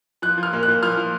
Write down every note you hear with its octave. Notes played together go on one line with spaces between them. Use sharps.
F3 F#6
F3
F6
A#2
F#6
A#2
F3 F6
F3